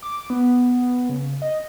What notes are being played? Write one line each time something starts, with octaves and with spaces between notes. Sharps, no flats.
D6
B3
C#3
D#5